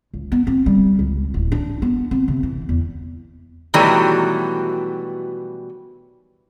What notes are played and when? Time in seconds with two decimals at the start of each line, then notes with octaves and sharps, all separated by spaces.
0.14 C#2
0.32 B3
0.47 C4
0.66 G3
0.99 C#2
1.34 D1
1.52 D4
1.82 B3
2.11 C4
2.28 C3
2.43 E3
2.69 E2
3.74 B2 D#3 E3 F#3 G3 A3